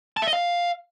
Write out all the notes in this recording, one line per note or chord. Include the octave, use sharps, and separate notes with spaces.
A5
E5
D#5
F5